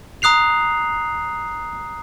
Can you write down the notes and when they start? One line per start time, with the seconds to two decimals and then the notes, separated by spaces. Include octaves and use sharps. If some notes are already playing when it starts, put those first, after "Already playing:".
0.22 A#5 D#6 F#6 C7 F7